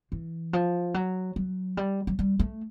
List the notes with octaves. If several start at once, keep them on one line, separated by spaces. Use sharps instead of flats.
E3
F3
F#3
F#3
G3
F#3
G3
A3